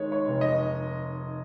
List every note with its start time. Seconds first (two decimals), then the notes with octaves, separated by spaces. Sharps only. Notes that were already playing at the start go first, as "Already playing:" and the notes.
Already playing: D#3 G#3 C#5
0.12 C#5
0.27 F1
0.41 D#5